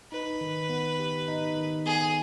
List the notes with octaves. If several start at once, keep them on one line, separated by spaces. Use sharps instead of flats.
D#4 B4
D#3
B3
G4
D#4
D#3
B3 G#4